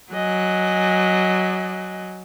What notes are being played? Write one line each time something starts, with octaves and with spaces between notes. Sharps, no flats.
F#3 D#5 G#5 F#6